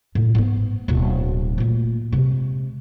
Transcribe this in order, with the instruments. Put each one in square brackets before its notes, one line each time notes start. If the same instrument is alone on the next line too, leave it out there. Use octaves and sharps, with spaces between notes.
[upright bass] A2
G#2 B3
D1 B2
A#2 A3
C3 G#3